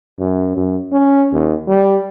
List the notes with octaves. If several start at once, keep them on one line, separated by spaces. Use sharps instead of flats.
F#2
F#2
C#4
D#2
G3